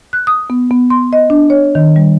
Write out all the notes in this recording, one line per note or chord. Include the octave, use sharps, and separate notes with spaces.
F#6
D#6
B3
B3
C6
D#5
D4
C#5
D#3
G3